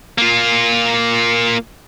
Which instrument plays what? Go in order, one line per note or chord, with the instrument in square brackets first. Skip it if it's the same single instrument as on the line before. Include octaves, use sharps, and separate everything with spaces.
[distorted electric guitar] A#3 F4